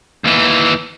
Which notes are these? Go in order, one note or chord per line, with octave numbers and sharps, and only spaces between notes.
D#2 E3